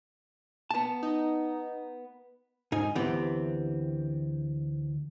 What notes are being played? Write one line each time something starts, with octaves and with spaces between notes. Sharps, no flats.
B3 A5
D#4
G#2 D#4 G#5
D2 E3 B3 C4 G4